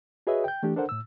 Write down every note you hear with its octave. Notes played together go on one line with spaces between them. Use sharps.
F#4 G#4 B4 C#5 D#5 E5
G5 G6
E3 A3 D4 G4
D4 A4 A#4 C5 F#5
A2 E6